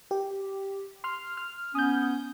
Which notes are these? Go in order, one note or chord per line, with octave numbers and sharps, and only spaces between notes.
G4
C6 F6
F6
B3 C#4 D#6 G6